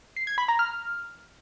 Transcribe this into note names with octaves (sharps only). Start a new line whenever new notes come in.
C7
G#6
B5
A#5
F6